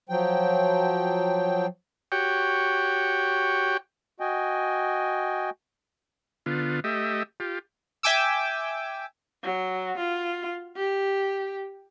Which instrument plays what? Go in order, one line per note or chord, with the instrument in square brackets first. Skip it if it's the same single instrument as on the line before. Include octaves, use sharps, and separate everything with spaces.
[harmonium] F3 F#3 G5
[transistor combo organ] F#4 G4 C#5 G5
[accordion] F#4 D#5 G5 G#5
[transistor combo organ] D3 B3 F4
A3 G4 D#5 E5
F4 G4
[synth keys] E5 G5 G#5 D6 E6
[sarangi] F#3
F4
G4